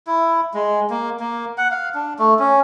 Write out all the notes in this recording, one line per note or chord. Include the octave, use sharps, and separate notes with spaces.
E4
G#3
A#3
A#3
F#5
F5
D4
A3
C#4